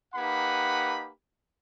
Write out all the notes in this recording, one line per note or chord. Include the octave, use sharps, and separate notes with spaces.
A#3 D#4 G4 B4 F#5 B5